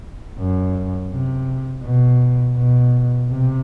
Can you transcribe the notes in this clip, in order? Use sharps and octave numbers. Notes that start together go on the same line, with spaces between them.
F#2
C3
B2
B2
C3